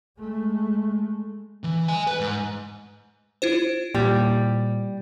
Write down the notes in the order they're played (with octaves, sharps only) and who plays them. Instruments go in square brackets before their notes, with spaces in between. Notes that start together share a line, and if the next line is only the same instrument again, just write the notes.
[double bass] G#3 A3
[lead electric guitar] E3
D#5 G#5
B4
G#2
[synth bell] E4 F4 C5
[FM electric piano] A#2 [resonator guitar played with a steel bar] G3